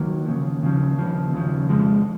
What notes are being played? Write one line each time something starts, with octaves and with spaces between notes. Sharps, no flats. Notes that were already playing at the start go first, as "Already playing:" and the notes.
Already playing: D#2 D#3 F#3 A#3
D#2 C#3 F3
D#2 C#3 F3
D#2 C#3 F3
D#2 C#3 F3
F2 F3 G#3